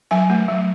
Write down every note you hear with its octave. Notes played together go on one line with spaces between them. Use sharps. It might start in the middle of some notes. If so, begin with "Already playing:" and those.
F#3 G#5
A3
F#3